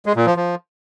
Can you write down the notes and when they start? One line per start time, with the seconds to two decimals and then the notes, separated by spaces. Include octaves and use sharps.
0.06 G#3
0.16 A#2
0.26 F3
0.36 F3